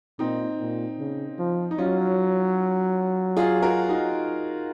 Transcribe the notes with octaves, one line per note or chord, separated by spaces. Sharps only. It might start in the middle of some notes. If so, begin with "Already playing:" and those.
A#2 C4 D#4
A#2
C#3
F3
D#4
F#3 C#4 F4
F4 G#4
F#4 A#4
D#4 F#4